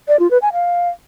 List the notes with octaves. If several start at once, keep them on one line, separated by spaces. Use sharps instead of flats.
D5
F4
B4
G#5
F5